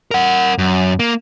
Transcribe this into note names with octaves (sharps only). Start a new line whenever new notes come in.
A#4 F#5
F#2
A#3